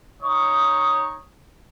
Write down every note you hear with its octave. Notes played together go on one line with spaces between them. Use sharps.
D#4 C#5 C#6 D#6